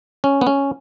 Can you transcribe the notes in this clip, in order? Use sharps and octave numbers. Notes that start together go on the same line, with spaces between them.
C#4
B3
C#4